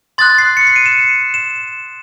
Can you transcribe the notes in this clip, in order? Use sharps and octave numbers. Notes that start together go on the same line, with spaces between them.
C6 D#6 F#6 A6
C7
C#7
C7
D#7
E7
E7